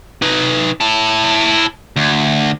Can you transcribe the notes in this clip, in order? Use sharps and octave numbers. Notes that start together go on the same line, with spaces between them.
D#4 B4
E4 A5
D2